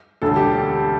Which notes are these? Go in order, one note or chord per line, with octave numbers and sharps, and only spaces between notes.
E1 D2 D3 A4
G4